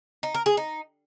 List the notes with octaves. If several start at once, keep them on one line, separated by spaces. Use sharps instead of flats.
D#4
A#4
G#4
D#4